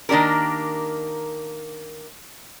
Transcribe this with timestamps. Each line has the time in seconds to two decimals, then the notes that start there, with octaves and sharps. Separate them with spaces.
0.09 D#3 A#3 D4 G4 A#4